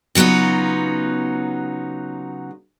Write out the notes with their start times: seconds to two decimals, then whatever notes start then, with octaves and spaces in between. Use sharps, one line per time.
0.15 C#3 F#3 B3 D#4 F4